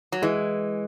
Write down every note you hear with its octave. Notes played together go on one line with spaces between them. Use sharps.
F#3
E3 G#3